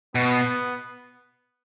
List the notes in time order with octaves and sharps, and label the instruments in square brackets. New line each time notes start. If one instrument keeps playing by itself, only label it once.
[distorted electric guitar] B2 [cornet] B3